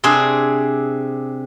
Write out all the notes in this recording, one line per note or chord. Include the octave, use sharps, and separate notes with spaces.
C3 C4 D4 G#4